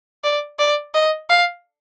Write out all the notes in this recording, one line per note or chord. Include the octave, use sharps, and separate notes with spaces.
D5
D5
D#5
F5